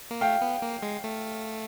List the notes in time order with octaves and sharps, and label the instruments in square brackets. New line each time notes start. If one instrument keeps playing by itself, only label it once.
[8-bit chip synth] A#3
[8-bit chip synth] A3 [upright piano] F5 G5
[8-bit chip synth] B3
A#3
G#3
A3